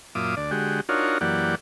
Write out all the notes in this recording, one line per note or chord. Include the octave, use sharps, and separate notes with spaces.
F#2 A#2 F4 E5 D6 D#6
D2 D5
D3 G#3 F#4 G4
D4 D#4 F4 F#4 A#4 C#5
F#2 E3 A#3 G4 D5 F#5